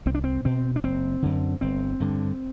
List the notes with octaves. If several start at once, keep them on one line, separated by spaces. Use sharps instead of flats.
C2 C4
D4
C4
B2 C4
D4
F#1 C4
F#2 D3
G1 C4
G2 D3